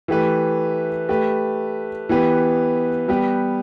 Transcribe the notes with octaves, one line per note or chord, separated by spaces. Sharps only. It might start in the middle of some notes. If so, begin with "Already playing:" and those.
E3 A3 G4 B4
A3 G4 B4
E3 B3 G4 B4
G3 B3 G4 B4